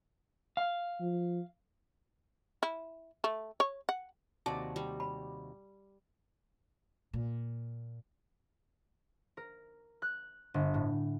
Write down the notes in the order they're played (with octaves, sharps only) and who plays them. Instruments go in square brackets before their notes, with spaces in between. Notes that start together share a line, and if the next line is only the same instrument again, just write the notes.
[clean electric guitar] F5
[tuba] F3
[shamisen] E4
A3
C#5
F#5
[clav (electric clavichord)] D#2 C3 F#4 [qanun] D5 [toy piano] A5
[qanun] G3
[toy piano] B5
[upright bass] A#2
[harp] A#4
F#6
G1
A2